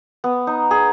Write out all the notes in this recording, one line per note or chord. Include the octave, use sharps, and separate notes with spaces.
B3
D#4
G#4